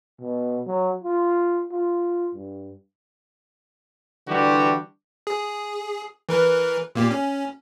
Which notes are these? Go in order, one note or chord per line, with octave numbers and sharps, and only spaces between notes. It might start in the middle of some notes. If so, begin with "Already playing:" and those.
B2
F#3
F4
F4
G2
D3 E3 G3 D4 F#4 G4
G#4
E3 A#4 B4
A#2 A#3 G4
C#4